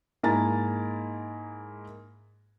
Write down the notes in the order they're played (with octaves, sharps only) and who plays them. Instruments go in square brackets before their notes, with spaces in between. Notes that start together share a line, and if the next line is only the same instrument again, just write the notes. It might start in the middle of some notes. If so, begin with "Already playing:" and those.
[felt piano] G#2 A#3 E4 G#5 A#5 A6